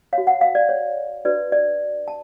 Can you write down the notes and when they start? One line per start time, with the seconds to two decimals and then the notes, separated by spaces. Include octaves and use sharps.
0.13 C#5 F5
0.18 F#4
0.27 F#5
0.41 F5
0.55 D5
0.69 C#5
1.25 D4 F#4 B4 D5
1.52 D5
2.08 A5